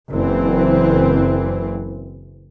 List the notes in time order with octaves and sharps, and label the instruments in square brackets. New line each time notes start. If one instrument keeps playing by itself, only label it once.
[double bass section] F#1 E3 C4